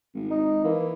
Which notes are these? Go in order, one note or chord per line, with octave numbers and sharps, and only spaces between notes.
G#1
D#4
E3 A#3